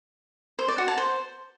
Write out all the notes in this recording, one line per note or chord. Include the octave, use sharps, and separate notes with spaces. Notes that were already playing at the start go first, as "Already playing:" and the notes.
C5
D5
F#4
A5
C5